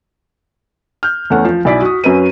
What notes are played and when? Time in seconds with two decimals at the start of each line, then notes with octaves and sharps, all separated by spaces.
1.03 F6 G6
1.30 E2 A3 C#4 F#5
1.45 F3
1.65 B1 E4 D5 G#5 B6
1.82 F#4 D#6
2.04 F#2 F#3 C#4 F#4 B4 D#7